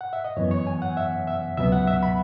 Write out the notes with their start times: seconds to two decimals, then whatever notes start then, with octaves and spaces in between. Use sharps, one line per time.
0.01 F#5
0.13 E5
0.24 D#5
0.37 F#2 E3 B3 C#5
0.51 C#5
0.67 G#5
0.82 F#5
0.97 E5
1.27 E5
1.57 C#2 B2 F#3 B3 E5
1.72 F#5
1.87 E5
2.03 B5